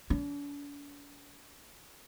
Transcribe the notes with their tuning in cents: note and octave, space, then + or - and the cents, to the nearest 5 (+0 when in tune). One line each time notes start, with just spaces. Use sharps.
D4 -45